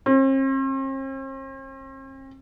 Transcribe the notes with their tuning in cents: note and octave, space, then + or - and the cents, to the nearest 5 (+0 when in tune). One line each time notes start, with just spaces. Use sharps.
C4 +45